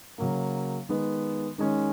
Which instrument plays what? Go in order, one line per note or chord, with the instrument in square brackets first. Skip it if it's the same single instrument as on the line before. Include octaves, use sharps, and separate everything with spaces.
[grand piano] C#3 F#3 A#3
D#3 G#3 B3
D#3 G#3 C#4